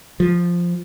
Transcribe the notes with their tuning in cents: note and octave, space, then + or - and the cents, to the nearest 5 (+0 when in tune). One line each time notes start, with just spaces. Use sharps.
F3 +0